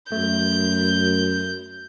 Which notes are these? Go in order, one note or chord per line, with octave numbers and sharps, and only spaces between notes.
F#2 A3 G6